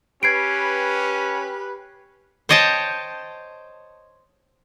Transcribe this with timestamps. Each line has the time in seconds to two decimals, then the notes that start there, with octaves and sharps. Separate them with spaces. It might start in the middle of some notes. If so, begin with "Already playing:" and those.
0.23 C#4 G4 B4 G#6 C7 D7
2.49 C5 C#5 D#5 G5 A5